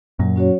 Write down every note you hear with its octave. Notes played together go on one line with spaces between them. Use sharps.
F#2 A#2 F#3
C#4 F#4 C#5